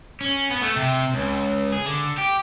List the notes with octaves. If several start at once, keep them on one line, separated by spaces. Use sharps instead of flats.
C#4
B3
A3
C3
C#2
G#4
D3
G4